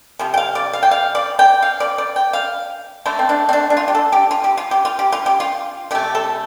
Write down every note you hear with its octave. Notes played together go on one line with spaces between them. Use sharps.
C3 F3
G5
F5
D5
F5
G5
F5
D5
G5
F5
D5
D5
G5
F5
D3 A3 C5
C4
D4
C4
D4
D4
F4
G4
A4
G4
F4
G4
F4
G4
F4
G4
F4
G4
F4
C3 A3 G4
A4